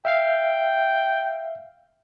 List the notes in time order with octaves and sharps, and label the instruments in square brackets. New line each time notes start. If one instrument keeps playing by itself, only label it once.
[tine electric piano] E5 F5 C7 [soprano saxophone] G5